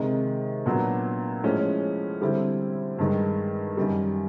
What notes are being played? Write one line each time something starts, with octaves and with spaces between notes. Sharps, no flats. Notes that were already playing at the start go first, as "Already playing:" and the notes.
Already playing: C3 D#3 G#3
A#2 F#3 B3 D4
A2 F3 G#3 C#4
D3 G3 C4 E4
G2 D#3 G#3
F#2 D#3 G3